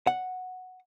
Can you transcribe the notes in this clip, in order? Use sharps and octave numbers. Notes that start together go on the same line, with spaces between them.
F#5